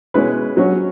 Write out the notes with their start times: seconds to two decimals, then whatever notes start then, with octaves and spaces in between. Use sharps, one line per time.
0.14 B2 G#3 C#4 E4 B4
0.57 F#3 C#4 F#4